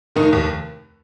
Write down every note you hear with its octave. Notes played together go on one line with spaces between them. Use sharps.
F1 D#3 D#4
D#2